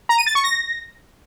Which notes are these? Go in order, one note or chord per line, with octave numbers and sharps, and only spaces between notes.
A#5
D#7
A6
C#6
A#6